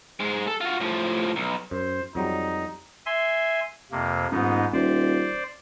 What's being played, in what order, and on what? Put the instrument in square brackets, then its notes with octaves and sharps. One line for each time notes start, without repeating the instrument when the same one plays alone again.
[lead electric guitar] G#2 G#3
A4
F4 F#4
A2 F3
B1
[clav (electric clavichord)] F#2 [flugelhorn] C5
[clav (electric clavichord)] F2 F#3 G3 [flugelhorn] D#4
[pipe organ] E5 G#5 C6
F2 C3 A#3
[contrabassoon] D#1 [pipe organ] G#2 B3 D#4
[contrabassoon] D#1 [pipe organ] C5 D5